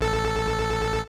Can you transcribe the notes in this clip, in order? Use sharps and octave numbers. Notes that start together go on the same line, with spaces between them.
A1 A4